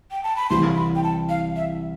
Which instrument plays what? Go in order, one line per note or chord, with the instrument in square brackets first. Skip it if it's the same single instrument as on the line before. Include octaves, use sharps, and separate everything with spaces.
[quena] G5
A5
B5
[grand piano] C2 C3 E3 [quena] C6
[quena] B5
G5
A5
F5
E5